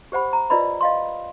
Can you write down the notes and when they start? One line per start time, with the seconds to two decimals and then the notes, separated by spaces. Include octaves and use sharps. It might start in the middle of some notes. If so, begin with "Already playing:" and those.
0.12 G4 C5 F#5 B5
0.33 A#5
0.50 E4 F4 B4 D5 D#5 B5
0.81 D#5 F5 C6